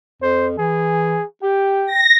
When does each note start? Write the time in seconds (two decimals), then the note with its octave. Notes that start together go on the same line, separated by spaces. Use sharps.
0.22 F2 C5
0.58 E3 G#4
1.43 G4 G5
1.86 A#6